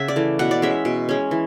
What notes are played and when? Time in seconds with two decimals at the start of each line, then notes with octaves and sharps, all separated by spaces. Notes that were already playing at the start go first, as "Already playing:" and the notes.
Already playing: C#3 E5 F#5
0.08 D5
0.16 E3 A3
0.39 B2 F#5
0.51 D5
0.62 G#3 C#4 E5
0.85 B2
1.09 G#3 C#4
1.31 E3